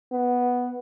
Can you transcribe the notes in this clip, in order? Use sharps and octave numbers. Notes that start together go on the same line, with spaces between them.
B3